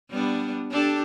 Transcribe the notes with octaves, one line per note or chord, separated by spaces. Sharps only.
G3 B3 D4
D4 G4 A4